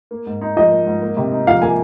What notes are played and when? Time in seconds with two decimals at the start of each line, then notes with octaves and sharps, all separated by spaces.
0.11 A#3
0.26 G#2
0.41 D#4
0.56 F3 D#5
0.71 A#3
0.86 G#2
1.02 A#3
1.17 C3
1.32 D#4
1.47 F3 F5
1.62 A#3 G#5